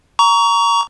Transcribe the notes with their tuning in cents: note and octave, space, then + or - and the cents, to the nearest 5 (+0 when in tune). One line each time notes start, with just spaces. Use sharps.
A#5 +0 C#6 +30